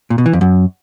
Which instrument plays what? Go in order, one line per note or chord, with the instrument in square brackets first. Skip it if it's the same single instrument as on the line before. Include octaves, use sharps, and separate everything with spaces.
[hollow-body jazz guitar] A#2
B2
E3
F2
F#2